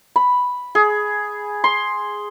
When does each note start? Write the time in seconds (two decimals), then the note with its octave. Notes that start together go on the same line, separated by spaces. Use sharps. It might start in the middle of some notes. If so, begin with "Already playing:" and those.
0.16 B5
0.75 G#4
1.64 C6